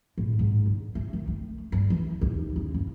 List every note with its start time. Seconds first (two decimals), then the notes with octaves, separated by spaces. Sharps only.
0.18 A2
0.39 G#2
0.66 D3
0.95 A3
1.13 D#3
1.28 A3
1.72 G2
1.90 E3
2.21 D#2
2.56 C#3
2.74 F#1